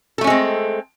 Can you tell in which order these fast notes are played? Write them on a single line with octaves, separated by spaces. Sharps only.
A4 A3 C#4 G#3 C4